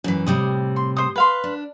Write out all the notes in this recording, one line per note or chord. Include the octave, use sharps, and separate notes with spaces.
F#2 E3
A2 C3 G3 D#6
C6
C5 D#6
B4 F5 C6
D4